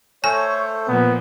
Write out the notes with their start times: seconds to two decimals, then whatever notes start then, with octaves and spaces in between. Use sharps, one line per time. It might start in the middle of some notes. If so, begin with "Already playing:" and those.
0.24 A3 A4 C5 C#5 G#5
0.88 A#2 F3 B3